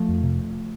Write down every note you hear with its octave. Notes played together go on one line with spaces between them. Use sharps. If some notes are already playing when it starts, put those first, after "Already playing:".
Already playing: F3 A3
F2
C3